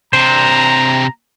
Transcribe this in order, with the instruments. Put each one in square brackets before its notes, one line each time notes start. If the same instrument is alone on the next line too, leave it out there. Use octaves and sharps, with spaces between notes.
[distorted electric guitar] C3 D4 [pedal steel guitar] C5 [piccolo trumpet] A#5